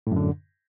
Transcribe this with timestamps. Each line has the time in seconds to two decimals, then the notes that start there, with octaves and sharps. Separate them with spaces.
0.07 A2
0.12 F#2
0.16 D3